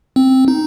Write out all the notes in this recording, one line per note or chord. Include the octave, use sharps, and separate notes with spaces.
C4
D#4